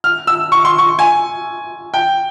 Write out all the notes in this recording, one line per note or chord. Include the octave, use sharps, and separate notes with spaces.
F6
E6
C#6
C6
C#6
G#5
G5